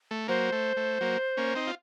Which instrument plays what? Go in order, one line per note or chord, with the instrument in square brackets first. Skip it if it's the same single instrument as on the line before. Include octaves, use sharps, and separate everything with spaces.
[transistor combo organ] A3
[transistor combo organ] F#3 A#3 [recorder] C5
[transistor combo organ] A3
A3
F#3 A#3
A#3 C#4
C4 D#4
F4